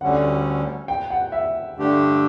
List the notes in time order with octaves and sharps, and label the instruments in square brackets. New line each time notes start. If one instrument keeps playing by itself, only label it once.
[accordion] D2 D3 G3 C#4 [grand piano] F#5
[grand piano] G5
F#5
E5
[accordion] G2 D3 A3 D4 G4